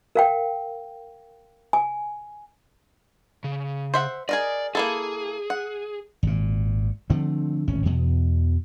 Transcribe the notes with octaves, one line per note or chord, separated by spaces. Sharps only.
A#4 F5 G5
G#5
C#3
C5 E5 F#5
G#4 A#4 D5 D#5
A#3 E4 G#4 A4
F#5
G#1 A#2
D3 F3 A3 C4
D1 G#1 C#4
E2 B2